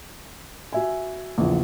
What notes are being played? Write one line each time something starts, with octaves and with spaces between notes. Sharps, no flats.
F#4 E5 G#5
A#1 E2 C#3 F3